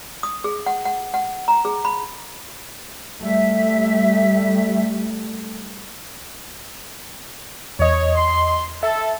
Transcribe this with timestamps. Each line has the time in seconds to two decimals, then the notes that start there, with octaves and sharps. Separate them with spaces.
0.23 D#6
0.44 G#4
0.66 F#5
0.85 F#5
1.14 F#5
1.48 A#5
1.65 G#4
1.85 B5
3.22 G3 A3 E5
7.79 E2 C#5 D#5
8.16 C6
8.83 A4 E5